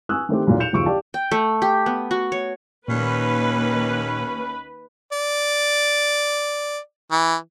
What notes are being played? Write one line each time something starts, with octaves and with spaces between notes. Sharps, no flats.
G#5 C#6 D#6 E6 F#6
D#3 A3 C4 G4
B1 E2 A#2
G6 C#7 E7 F7
F#1 D#2 F3 C#6 E6 D7
G4 D5 F5 A5
G5
A3
G4
B3
F#4
C#5
D#2 A#2 D#3 A#3 C#4 B4
D5
E3